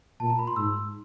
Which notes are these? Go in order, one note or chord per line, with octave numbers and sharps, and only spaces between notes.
A#2 A5
A#5
B5
C6
G#2 E6